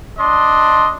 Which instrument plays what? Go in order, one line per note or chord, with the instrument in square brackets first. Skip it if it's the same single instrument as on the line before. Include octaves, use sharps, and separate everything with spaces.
[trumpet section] D4 D#5 C6